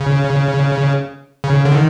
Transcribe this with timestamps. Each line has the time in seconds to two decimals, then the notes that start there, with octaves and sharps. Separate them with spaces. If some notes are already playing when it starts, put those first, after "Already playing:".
Already playing: C#3
1.44 C#3
1.65 D3
1.72 D#3